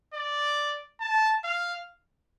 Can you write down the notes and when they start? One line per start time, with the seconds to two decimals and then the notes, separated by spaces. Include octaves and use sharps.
0.14 D5
1.00 A5
1.44 F5